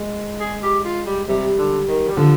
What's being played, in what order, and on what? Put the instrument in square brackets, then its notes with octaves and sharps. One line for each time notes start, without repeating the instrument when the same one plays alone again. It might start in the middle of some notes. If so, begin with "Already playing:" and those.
Already playing: [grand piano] G#3
[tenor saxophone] G#4
G4
F4
G3
[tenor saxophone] C3 [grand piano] G3
[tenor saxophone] D3
D#3
G3
[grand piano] D3 [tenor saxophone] F3